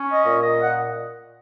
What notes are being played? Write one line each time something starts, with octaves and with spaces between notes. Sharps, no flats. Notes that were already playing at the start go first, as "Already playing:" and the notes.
Already playing: C#4
D#5
A#2
D#5
F#5